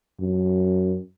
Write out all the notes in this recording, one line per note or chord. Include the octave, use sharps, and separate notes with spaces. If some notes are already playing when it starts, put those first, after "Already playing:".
F#2